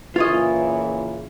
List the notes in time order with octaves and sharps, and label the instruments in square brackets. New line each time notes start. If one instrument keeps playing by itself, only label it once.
[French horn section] A#2 C#3 E3 [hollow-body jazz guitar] F4 C#5 D#5